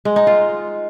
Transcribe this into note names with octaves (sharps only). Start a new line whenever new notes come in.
G#3
D#4
F4